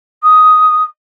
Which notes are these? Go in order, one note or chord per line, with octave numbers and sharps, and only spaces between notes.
D#6